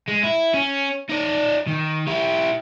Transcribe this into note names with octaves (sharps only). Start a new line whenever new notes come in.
G#3
E4
C#4
D#4 D5
D#3
E4 G4